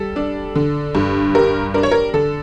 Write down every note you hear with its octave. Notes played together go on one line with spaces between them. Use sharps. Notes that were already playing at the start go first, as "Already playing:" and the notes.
Already playing: G3 A4
D4
D3
G2
G3 A#4
D4 A#4
C#5
A#4
D3 A4